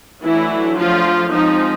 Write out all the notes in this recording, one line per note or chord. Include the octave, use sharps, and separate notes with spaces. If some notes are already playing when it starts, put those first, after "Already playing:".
E3 F#3 A3 D4 E4
F3 F4
F3 G#3 C4 D#4